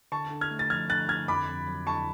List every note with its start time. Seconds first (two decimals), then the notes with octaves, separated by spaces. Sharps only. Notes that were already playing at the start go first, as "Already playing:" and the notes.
0.12 D3 A5 C#6
0.31 D3
0.41 F6 G#6
0.51 A3
0.59 A6
0.70 F3 F6 G#6
0.89 D3 F#6 A6
1.08 D3 F6 G#6
1.28 F2 B5 D6
1.48 F2
1.67 F#3
1.87 D3 A5 C#6